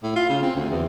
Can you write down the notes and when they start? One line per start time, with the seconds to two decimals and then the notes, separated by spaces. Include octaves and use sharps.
0.04 A2
0.16 F4
0.29 C#3
0.42 C4
0.56 D2
0.70 E2